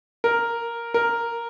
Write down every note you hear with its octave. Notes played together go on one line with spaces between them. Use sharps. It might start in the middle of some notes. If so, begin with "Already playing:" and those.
A#4
A#4